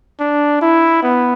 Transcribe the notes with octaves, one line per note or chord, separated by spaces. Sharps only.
D4
E4
B3